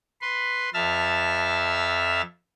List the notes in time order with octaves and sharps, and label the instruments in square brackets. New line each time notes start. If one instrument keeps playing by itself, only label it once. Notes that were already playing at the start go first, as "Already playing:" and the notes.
[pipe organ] B4 C6
F2 E5 A5 E6 F6